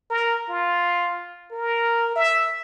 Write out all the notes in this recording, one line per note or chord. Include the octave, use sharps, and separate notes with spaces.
A#4
F4
A#4
E5